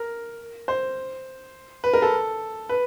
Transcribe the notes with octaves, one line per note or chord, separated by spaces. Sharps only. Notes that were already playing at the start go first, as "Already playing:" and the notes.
Already playing: A#4
C5
B4
A#4
A4
B4